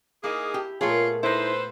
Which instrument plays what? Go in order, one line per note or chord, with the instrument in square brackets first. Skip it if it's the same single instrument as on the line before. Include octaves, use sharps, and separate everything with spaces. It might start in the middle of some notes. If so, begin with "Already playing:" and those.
[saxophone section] A#3 D#4 G#4 [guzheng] E4
[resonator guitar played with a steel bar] G4
[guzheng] A#2 A3 B3 [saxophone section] F4 C#5 [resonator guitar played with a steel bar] G#4
[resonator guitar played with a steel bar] D#4 E4 [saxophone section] A4 B4 C5